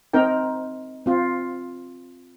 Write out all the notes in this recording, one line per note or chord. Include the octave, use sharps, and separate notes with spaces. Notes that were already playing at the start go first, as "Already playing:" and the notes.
C4 D#4 A#4 G5
C4 F4